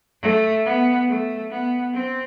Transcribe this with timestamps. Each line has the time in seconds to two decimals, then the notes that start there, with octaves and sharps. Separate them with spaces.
0.22 A3
0.65 B3
1.08 A3
1.50 B3
1.93 C4